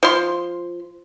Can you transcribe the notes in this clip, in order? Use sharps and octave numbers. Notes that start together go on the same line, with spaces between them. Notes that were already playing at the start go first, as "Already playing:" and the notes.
F3 C6